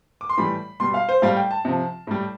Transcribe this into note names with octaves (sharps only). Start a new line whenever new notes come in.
D6
C6
A2 E3 G3 B5
B2 G3 C6
F5
C5
A2 G3 F5
G5
A5
C3 F3
A2 G3